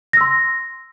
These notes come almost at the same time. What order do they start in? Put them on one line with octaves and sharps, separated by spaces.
A#6 E6 C6